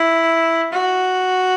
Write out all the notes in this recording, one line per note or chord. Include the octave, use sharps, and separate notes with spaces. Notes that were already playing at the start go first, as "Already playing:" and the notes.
Already playing: E4
F#4